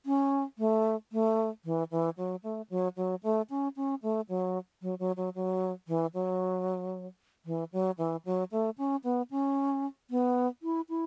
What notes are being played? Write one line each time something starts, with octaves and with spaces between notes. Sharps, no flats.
C#4
A3
A3
E3
E3
F#3
A3
F#3
F#3
A3
C#4
C#4
A3
F#3
F#3
F#3
F#3
F#3
E3
F#3
E3
F#3
E3
F#3
A3
C#4
B3
C#4
B3
E4
E4